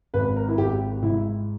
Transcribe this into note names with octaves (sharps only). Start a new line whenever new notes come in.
G#1 B4
A#4
E4
G#1 G4
G#2 E4